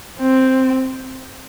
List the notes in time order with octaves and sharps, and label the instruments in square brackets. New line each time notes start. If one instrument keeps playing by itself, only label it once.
[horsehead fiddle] C4